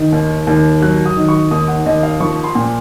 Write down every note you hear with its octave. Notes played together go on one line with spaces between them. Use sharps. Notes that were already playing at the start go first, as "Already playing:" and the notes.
Already playing: D#3
D#2
D#2
F#3 F#6
D#6
D#3
C#6
D#2 D#6
F#5
D#2 D#5
F5
F3 C#6
C6
A#2